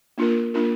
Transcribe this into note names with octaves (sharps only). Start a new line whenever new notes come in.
A#3 D4 F4 A#4
A#3 D4 F4 A#4